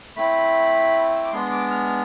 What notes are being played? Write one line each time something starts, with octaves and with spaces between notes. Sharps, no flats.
A3 C4 E4 B5
E6
D6
G#3 B3 D4 C6
D6
F6